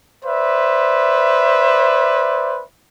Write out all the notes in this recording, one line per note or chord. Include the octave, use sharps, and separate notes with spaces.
B4 C5 D5 E5